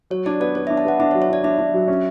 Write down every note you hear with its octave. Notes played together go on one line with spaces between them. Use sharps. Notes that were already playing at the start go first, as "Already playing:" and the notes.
F#3 C#5
D4 D5
B3 D5
B3 C#5
D4 E5
A5
B3 F#5
D4 E5
C#5
F#3
C#5
D4 D5
D4 E5
D4
F#3
C#4